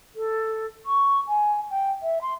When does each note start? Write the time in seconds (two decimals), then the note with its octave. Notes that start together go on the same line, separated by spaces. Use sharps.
0.15 A4
0.86 C#6
1.27 G#5
1.70 G5
2.02 E5
2.21 C6